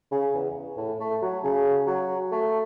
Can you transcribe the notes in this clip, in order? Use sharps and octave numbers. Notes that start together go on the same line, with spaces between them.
C#3
E2
A2
A3
F#3
C#3
F#3
A3